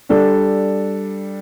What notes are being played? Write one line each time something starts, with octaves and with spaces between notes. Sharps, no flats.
G3 D4 A4